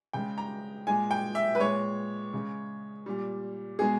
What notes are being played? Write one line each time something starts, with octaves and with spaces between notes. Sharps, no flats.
C#3 G#3 G5
A#5
A#2 G#3 G#5
G5
E5
B4
A#2 G#3 C#5
C#3 G#3
A#2 G3
B2 G#3 G#4